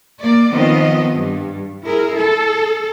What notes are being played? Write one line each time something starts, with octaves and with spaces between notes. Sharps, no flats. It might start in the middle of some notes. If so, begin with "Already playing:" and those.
A#3 D5
D#3 F3 B3 C4 D#5
G2
E4 G#4 A#4
A4